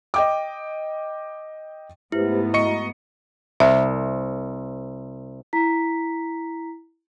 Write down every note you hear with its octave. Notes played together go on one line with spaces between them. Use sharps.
D#5 G5 D6
G#2 A3 B3 E4 G4 B4 C5
F#4 D#5 A#5 C#6 C#7
C2 E5
E4 A#5 B6